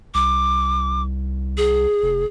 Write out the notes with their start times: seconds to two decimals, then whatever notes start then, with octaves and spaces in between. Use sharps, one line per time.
0.14 C2 D6
1.57 G#4
2.02 F1